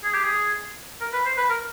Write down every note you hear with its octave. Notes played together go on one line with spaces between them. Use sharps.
G#4
G4
G#4
A#4
B4
C5
B4
A#4